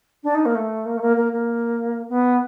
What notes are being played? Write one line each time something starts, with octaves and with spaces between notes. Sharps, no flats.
D4
D#4
A#3
A3
A#3
A3
A#3
A#3
A#3
B3